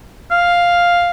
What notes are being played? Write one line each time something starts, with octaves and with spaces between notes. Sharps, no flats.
F5